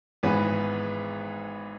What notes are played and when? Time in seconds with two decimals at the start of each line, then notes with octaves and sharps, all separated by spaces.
0.23 G#1 G#2 E3 B3 B4